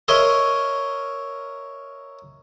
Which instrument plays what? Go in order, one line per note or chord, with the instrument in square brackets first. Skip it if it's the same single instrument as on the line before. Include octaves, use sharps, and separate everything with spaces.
[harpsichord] A#4 C#5 D#5 E5 C6